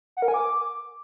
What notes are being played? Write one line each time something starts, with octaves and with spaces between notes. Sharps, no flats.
F#5
A#4
G#5
D6